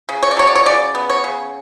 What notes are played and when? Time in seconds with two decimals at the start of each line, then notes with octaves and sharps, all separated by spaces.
0.09 C#3
0.23 C#5
0.31 D5
0.37 F#3 C#5
0.47 D5
0.55 C#5
0.66 C#3 D5
0.95 B3
1.09 C#5
1.24 C#3